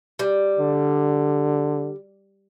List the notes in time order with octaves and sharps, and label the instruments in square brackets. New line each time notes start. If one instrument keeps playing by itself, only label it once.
[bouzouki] G3
[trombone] D3